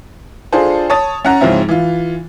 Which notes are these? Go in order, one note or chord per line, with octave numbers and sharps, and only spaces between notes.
D4 F4 G#4 A4 C5
C#5 A5 D#6 A6
C#4 F#5 A#5
G#2 C#3 F3 C4 C#4 E4
E3 F4